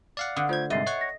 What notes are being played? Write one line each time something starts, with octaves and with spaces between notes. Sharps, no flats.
D5 F5 F#5
D3 D#6
A3 F4 C5 G6 G#6
G#2 C3 G3 D#5 E5 A6 C7
C#5 F#5 C#6
A#6